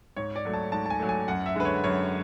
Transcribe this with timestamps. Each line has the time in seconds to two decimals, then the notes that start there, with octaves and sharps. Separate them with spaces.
0.16 G#2 C#5
0.36 D5
0.45 F#3 A3
0.54 A5
0.72 G#2 A5
0.86 A5
0.90 G#5
1.00 F#3 A3
1.09 G#5
1.28 F#2 F#5
1.46 E5
1.56 D3 G#3 B4
1.65 C#5
1.84 F#2 C#5